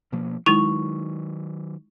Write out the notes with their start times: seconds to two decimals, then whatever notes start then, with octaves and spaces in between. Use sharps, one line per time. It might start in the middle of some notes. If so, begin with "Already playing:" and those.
0.12 B2 F3 A#3
0.46 D#3 F#3 G#3 D#4 E4 C#6 F7